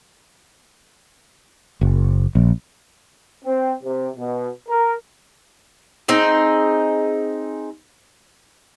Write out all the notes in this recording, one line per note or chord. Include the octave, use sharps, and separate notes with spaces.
F#1
A#1
C4
C3
B2
A#4
C4 D#4 G#4